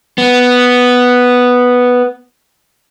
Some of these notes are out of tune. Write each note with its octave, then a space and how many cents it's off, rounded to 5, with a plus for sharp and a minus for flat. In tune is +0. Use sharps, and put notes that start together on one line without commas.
B3 +0